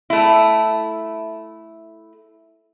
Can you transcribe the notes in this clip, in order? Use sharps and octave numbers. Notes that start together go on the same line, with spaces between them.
A3 E4